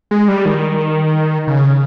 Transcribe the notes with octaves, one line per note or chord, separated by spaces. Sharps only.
G#3
G3
D#3
C#3